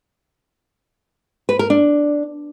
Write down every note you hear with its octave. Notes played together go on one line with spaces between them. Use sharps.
B4
A#4
D4